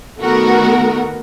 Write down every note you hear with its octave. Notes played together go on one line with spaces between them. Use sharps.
D#3 A3 B3 F#4 A#4